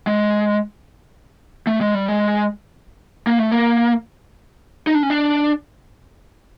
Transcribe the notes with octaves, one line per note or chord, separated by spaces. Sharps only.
G#3
A3
G#3
G3
G#3
A#3
A3
A#3
D#4
D4
C#4
D4